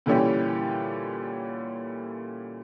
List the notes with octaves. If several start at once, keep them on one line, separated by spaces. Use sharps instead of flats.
A#2 D3 E3 G3 C#4 G4